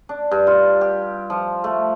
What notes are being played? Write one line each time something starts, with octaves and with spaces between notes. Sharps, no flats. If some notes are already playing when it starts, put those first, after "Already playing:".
D4
G2
F4
G4
F3
A3